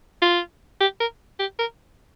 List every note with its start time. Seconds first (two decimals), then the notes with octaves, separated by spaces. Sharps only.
0.22 F4
0.81 G4
1.00 A#4
1.39 G4
1.59 A#4